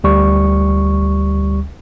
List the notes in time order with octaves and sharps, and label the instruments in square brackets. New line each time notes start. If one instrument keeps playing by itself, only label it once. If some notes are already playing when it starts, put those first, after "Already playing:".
[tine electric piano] D2 G3 C#6